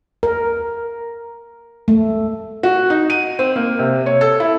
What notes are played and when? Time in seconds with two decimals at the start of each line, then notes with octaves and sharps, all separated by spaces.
0.23 A#4
1.88 A3
2.63 F#4
2.90 D#4
3.10 D#7
3.39 C4
3.56 A#3
3.79 C3
4.06 C#5
4.21 A4
4.40 E4